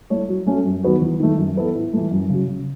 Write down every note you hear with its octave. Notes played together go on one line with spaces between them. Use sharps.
A3 E4 A4 C#5
F#3
A3 C#4 F#4 A4
F#2
D#3 F#3 B3 F#4
E2
D#3 A3
F#2
E3 B3 E4 A4
A2
E3 A3
F#2
C#3 F#3
C#3